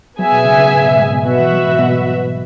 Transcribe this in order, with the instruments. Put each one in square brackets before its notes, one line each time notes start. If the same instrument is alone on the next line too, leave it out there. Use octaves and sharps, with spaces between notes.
[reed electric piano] F#3 [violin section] B3 G#4 E5 G#5
[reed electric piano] B2
C#3
C#3
G#2
B2
G#2
B2
[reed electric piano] B2 [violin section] F#4 B4 E5
[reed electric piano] E3
F#3
G#2
B2